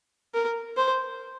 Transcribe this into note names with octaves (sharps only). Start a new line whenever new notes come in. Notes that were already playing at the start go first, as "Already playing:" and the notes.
A#4
C5